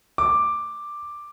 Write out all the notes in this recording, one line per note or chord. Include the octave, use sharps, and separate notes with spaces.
D6